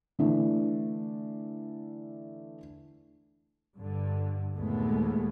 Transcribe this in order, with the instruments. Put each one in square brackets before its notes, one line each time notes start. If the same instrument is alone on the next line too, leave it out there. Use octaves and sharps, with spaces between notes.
[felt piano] D3 E3 A3 D4
[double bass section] G2 D3
D#2 A#2 G#3 A3 B3